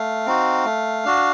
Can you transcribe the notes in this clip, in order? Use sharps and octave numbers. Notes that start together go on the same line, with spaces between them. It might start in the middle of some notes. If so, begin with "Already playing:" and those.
Already playing: A3 F5
C4 D#4 F#4
A3
D4 F#4